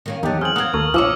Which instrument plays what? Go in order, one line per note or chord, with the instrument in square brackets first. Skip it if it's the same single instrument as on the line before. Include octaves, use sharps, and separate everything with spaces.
[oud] D#3 A#3 C#4
[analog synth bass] E2 [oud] D#3 F#3 [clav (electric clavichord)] D#4 G4 A5
[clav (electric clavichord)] C4 G#4 G5 [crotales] F6 F#7
[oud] A#3 C4 [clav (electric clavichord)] F#5 [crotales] D#6 G#6
[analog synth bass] D#2 [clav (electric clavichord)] A4 A#4 [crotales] C#6
[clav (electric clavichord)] A#1 [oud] E2 C#5 [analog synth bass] F3 [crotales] D6 E6 F6